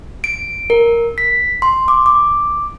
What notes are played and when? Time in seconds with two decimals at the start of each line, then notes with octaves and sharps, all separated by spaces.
0.24 D7
0.70 A#4
1.18 B6
1.62 C6
1.88 D6
2.06 D6